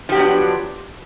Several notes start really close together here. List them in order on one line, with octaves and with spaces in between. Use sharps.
F3 G4 F#3 B3 D4